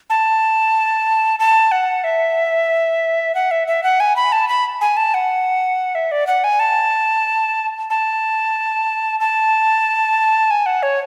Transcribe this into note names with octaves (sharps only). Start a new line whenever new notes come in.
A5
A5
F#5
E5
F#5
E5
E5
F#5
G#5
B5
A5
B5
G#5
A5
F#5
E5
D5
F#5
G#5
A5
A5
A5
G#5
F#5
C#5